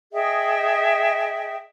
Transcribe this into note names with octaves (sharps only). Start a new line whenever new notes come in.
G#4 D#5 E5 G5